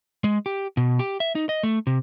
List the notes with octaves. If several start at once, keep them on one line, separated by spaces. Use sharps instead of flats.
G#3
G4
B2
G4
E5
D#4
D#5
A3
C3